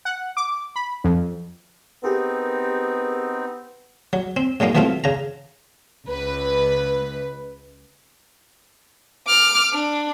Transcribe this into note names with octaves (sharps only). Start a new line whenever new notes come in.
F#5
D6
B5
F2
B3 C4 D#4 G4 G#4 A#4
F#3
C4
G#2 F#3 G#3 A#3 D#4
B2 E3 F#3 A3 C4 F4
C#3 A#5
C#2 B4
D6 F6
D4